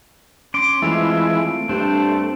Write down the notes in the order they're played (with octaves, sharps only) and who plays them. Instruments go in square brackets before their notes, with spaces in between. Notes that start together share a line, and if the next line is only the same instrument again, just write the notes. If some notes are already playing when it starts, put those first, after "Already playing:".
[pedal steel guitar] C#4 C6 D6 [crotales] D7
[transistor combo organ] E3 G#3 E4 [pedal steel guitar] A3 C4 F4
[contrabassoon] G2 [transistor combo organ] A3 [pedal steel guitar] C4 D4 C5